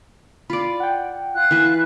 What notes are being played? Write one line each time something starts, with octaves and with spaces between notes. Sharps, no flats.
F4 D5 B5
F#5 G5
F4 F#6
E3 B4